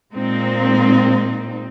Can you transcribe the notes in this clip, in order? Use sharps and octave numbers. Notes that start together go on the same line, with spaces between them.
A#2 G#3 C4 D#4